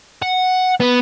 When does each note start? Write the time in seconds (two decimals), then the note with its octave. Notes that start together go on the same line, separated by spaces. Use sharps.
0.22 F#5
0.80 B3